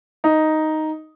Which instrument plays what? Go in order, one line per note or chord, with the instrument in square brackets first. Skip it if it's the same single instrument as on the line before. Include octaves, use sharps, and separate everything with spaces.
[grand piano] D#4